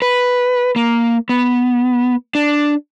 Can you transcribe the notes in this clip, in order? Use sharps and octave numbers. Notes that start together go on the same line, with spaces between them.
B4
A#3
B3
D4